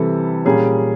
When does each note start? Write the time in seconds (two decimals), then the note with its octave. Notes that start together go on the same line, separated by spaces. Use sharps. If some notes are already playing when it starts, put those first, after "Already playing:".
Already playing: C3 E3 G3 A4
0.45 A#2 G3 A#3 C#4 G#4